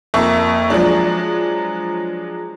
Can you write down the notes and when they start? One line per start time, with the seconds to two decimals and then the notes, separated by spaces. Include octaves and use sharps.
0.14 F2 A#3 E5 C#6
0.70 F3 F#3 G#3 D4